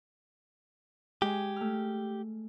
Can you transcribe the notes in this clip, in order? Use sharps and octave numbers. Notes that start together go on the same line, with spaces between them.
G#3 G4 G#5
A3 F6